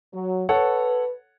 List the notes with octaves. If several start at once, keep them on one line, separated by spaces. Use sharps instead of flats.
F#3
A4 B4 C#5 F#5